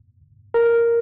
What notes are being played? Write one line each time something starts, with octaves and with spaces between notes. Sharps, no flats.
A#4